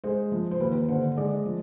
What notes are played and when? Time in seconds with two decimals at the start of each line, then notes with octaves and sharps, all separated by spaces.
0.04 G#3 C5
0.32 F3
0.51 C5
0.60 D#2 B4
0.89 D3 C5
1.17 G#3 D5
1.45 F3